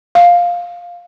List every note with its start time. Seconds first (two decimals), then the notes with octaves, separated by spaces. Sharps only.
0.15 F5